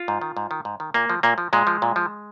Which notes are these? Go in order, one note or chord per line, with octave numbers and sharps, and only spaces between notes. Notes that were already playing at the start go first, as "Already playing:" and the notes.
Already playing: F4
G#2
D#3
G#2
D#3
G#2
D#3
A#2 A#3
F3
A#2 A#3
F3
A#2 G#3
F3
A#2
F3